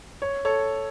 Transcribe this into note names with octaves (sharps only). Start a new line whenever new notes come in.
C#5
A4 C#5